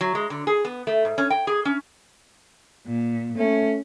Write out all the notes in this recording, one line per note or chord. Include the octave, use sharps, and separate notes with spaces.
F#3
G#3
D3
G#4
B3
A3
G#2
C#4
G5
G#4
C#4
A#2
A3 C#4